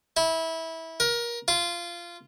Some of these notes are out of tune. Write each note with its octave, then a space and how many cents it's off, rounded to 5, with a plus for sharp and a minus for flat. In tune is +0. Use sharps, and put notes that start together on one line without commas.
E4 -20
A#4 +25
F4 -15